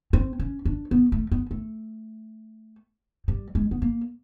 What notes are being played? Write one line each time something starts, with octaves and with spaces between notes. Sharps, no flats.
C4
C#4
D4
B3
A3
B3
A3
G3
G#3
B3
A#3